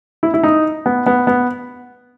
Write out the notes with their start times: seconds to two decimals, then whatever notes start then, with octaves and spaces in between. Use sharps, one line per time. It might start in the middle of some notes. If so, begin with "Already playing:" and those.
0.23 E4
0.34 E4
0.43 D#4
0.86 B3
1.06 B3
1.27 B3